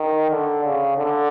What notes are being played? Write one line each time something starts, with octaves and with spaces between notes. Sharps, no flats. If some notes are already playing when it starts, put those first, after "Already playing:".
Already playing: D#3
D3
C#3
D3